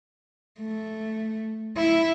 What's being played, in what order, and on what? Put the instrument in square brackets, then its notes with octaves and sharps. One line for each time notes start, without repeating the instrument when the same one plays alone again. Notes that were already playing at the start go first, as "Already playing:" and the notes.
[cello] A3
E4